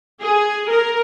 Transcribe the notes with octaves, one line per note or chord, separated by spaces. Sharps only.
G#4
A#4